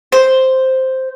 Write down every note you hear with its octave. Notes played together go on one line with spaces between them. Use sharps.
C5